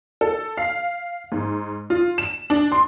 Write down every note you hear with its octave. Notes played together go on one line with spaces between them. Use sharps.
A4
F5
G#2
F4
E7
D4
C6